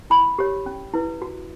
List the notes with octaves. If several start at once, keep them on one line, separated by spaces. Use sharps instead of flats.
E4 B5
G4 C#5
C#4
E4 B4
F#4